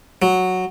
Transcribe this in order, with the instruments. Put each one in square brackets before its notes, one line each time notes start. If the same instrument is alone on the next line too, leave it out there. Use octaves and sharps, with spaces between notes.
[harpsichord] F#3